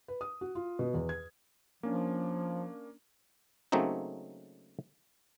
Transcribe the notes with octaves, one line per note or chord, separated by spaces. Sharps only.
B4
D#6
F#4
F4
B2
E2
G#6
F3 A#3 C#4 D4
C#3 F#3 A3 A#3 C4 D#4